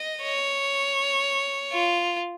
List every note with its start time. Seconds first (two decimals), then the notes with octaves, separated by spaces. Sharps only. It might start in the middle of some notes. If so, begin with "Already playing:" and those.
Already playing: D#5
0.23 C#5
1.73 F4